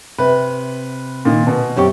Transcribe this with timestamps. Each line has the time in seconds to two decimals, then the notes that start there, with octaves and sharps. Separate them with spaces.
0.18 C3 B4
1.25 A#2 D#3
1.47 B2
1.76 F#2 C4 G4 C#5 C#6